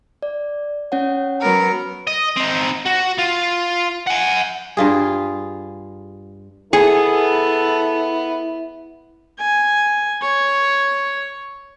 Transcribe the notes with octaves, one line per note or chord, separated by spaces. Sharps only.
D5
C#4 C#5 F#5
F#3 B3 A#4
D#5
C4 D#4
F#4
F4
F#5 G#5
G2 F4 G#4
B3 E4 G#4 A4
G#5
C#5